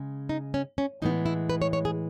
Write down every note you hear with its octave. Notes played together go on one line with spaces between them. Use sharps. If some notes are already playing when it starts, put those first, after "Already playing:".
Already playing: C#3 G#3
D#4
C#4
C#4
A2 E3 G#3 B3 D#4
E4
B4
C#5
C#5
G#4